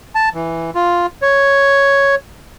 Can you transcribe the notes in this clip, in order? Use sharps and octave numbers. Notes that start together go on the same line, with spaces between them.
A5
E3
F4
C#5